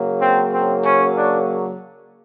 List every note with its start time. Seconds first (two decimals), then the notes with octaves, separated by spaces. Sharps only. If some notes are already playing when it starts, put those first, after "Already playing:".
Already playing: C#3 F#3 A#3
0.22 C4
0.52 C4
0.84 C#4
1.16 D4